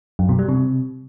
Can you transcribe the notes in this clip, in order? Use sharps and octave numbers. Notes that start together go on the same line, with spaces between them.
F#2
B2
G3
C3